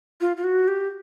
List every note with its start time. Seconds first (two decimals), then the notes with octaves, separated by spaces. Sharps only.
0.21 F4
0.37 F4
0.44 F#4
0.68 G4